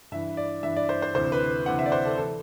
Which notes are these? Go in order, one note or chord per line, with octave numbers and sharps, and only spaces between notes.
G2 E3 E5
D5
G2 E3 E5
D5
C5
C5
D2 C3 E3 C5
B4
D2 C3 E3 F#5
E5
D5
C5
A4
E3 A4